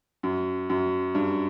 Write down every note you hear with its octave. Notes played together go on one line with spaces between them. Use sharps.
F#2
F#2
G2